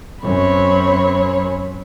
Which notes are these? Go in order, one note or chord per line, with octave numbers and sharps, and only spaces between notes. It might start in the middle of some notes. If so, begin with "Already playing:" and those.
F#2 C4 C#5 B5